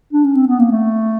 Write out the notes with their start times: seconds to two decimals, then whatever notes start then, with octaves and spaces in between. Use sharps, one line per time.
0.13 D4
0.24 C#4
0.35 C4
0.47 B3
0.60 A#3
0.72 A3